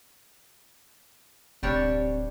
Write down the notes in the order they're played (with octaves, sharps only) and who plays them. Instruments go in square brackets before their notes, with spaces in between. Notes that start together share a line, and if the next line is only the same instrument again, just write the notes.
[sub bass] D1 [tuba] C3 [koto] G3 D4 C#5